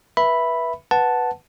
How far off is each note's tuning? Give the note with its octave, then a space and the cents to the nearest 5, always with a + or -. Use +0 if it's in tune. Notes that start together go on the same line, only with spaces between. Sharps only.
B4 -25 E5 +0 B5 +0
B4 +0 F#5 +0 A5 +0